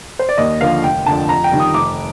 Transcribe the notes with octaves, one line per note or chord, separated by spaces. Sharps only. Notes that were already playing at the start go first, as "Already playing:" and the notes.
C5
D5
D#2 D#5
D3 F3 F5
F1 G5
F2 D3 A5
F2 A#5
G5
D#3 G3
D#6
F1 D6